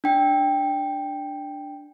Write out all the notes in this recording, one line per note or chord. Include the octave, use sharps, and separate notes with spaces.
D4 G5